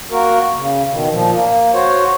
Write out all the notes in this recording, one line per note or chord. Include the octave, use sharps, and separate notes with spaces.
A#3 F#4 A#4
C#3
B2 D#3
A#2 F3
A#3
F#4 C5 C#5